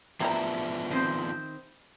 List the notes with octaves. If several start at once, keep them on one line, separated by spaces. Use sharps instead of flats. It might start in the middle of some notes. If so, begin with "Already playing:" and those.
C3 F3 B3 D4 E4 A#5
D#3 C4 C5